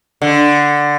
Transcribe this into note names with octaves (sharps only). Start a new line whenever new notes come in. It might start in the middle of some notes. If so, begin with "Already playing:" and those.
D3